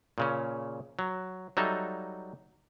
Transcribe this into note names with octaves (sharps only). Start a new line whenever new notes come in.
A#2 C#3 C#4
F#3
F#3 G3 D#4 A4 E5